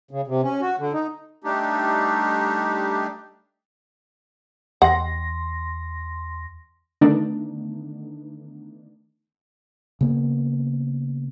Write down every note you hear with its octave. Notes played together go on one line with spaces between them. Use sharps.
C#3
C3
C#4
F#4
D3
D#4
G3 A3 D4 D#4 G4
E2 F#5 C6 A#6
D3 D#3 A3 B3 D4 D#4
C#3 A#3 B3